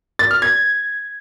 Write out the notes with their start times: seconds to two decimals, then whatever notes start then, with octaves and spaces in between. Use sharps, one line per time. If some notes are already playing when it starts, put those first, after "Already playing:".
0.19 A6
0.31 F6
0.42 G#6